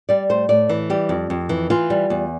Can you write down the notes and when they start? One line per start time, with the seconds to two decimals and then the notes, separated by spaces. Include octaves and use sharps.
0.09 G3 D5
0.29 A2 C5
0.49 A2 D5
0.69 E3
0.90 G3 G4
1.09 F2
1.30 F2
1.49 E3
1.70 E3 F4
1.90 G3
2.10 E2